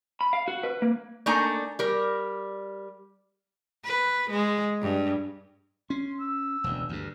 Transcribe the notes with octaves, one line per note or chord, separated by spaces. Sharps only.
B5
F5
F#4
B4
A#3
A3 A#3 D4 D#4 G#5 A#5
G3 A#4
B4
G#3
G2
C#4 C6
E6
E1 D2
D2 G2